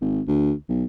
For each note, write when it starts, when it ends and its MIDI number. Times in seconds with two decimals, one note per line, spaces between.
0.01 0.21 32
0.28 0.52 38
0.69 0.84 35